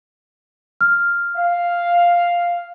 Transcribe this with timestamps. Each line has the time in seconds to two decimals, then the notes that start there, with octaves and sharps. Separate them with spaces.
0.81 F6
1.36 F5